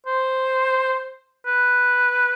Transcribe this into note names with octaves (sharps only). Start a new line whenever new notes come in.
C5
B4